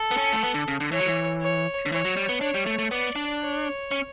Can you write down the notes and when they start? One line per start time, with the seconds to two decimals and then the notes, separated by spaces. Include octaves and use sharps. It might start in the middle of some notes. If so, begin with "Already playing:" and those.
Already playing: A4
0.11 B3
0.17 C#4
0.33 A3
0.43 B3
0.54 D3
0.68 C#3
0.80 D3
0.92 E3 C#5
1.00 F#3
1.06 E3
1.41 C#5
1.86 D3
1.91 E3 C#5
2.05 F#3
2.16 G3
2.29 B3
2.41 D4 C#5
2.54 G3
2.66 A3
2.79 A3
2.91 B3 D5
3.16 D4
3.41 C#5
3.91 C#4